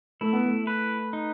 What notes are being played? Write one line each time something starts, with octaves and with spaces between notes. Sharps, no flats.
A3 E4
B3
A3
B4
D#4